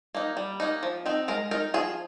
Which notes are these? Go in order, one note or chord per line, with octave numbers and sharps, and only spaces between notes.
A#3 D#4
G3
A#3 D#4
F3
C4 D#4
G#3 A#4
D#4 A#4
F3 G#4